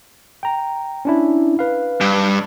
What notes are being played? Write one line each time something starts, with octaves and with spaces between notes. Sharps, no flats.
G5 A#5
C#4 D4 E4
B4 F5
G2